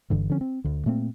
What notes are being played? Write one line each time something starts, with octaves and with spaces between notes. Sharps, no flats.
G1 G2 D3 E3
D3 F3 C4 C#4
C4
D2 D3
A#2 A3 A#3 C4